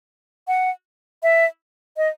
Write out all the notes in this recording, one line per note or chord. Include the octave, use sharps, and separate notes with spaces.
F#5
E5
D#5